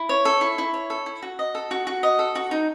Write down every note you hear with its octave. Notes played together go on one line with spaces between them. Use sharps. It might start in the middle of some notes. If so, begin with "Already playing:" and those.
Already playing: E4
C#5
A4
E4
E4
C#5
A4
E4
F#4
D#5
A4
F#4
F#4
D#5
A4
F#4
D#4